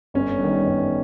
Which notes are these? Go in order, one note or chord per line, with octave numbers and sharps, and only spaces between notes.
G1 C#4
G2 D#3
G1